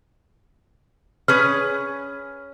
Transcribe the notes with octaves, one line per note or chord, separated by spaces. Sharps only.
C#4 G#4 B4 F6